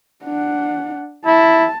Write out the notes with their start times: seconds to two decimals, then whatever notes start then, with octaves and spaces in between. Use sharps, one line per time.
0.24 D4 F#5
1.26 E4 A5